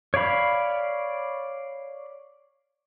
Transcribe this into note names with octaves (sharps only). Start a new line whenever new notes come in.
C#5 D5 F5 B5